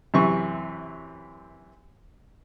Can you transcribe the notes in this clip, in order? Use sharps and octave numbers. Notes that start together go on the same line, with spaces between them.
F#2 C3 E3 C#6